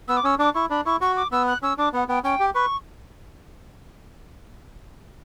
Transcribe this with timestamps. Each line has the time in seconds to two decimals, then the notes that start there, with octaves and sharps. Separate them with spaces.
0.08 B3 E6
0.17 D6
0.24 C#4 E6
0.39 D4 D6
0.54 E4 C#6
0.70 D4 B5
0.86 E4 C#6
1.01 F#4 C#6
1.17 D6
1.32 B3 E6
1.47 F#6
1.63 C#4 E6
1.78 D4 D6
1.93 B3 F#5
2.09 B3 G5
2.24 C#4 G5
2.40 G4
2.55 B4 C#6